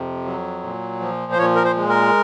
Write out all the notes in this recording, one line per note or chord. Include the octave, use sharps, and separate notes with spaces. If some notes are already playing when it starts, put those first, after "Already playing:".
Already playing: F2 C3
F#3
A#2
F3
C5
A#2 C#5
A#4
C5
G#3
A#4